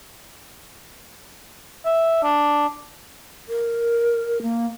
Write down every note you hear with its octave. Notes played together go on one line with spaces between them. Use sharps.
E5
D4
A#4
A#3